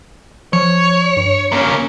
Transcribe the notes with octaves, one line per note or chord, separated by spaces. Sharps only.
F3 C#5
G2
A#3 C#4